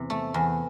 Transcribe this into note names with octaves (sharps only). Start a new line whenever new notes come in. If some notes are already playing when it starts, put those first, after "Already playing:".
Already playing: E2 C3
A3
E2